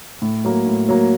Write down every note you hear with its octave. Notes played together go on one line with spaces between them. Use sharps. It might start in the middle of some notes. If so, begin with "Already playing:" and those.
A2
F#3 A#3
A2
F#3 A#3